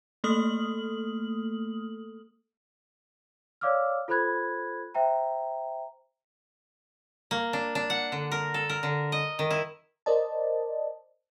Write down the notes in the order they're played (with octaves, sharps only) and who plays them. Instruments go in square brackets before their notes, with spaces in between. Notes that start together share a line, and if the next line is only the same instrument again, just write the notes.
[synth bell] A3 A#3 A4 D#6 F6 F#7
[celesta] C#5 D5 F5 D6 E6 F6
F4 A4 C5 B5 F#6 G#6
C5 E5 G5 A#5
[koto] A#3
D4
D4
F#5
D3
A#4
A4
A#4
D3
D#5
D#3
E4
[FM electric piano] A#4 C5 D5 D#5 A5